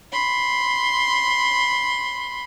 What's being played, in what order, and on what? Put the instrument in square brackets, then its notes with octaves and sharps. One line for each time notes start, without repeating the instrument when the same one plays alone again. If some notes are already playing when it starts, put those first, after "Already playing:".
[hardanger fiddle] B5 C6